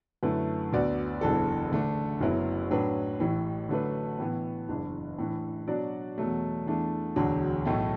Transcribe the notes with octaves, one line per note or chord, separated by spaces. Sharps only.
F#2 D3 A3 E4 B4
D2 D3 B3 F#4 D5
F#1 E2 E3 D4 A4
D3 A3 D4
F#1 F#2 F#3 B3 E4
A2 F#3 D4 B4
A1 A2 E3
D3 F#3 A3 D4 B4
A2 E3 B3
F#1 E2 E3 D4
A2 E3 D4
B2 F#3 D4 F#4 D5
E2 B2 F#3 A3
E2 E3 A3 D4
E1 D2 D3 F#3 D4
B1 A2 A3